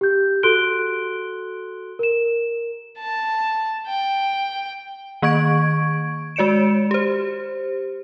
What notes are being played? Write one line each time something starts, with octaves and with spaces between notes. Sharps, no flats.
G4 G6
F#4 A4 C6 F#6 D7 G7
A#4 E7
A5
G5
D#3 A#3 C#6 G#6 D7
G#3 F#4 D5 C#7 D7 E7
G4 C5